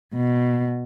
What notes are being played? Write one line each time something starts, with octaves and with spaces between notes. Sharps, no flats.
B2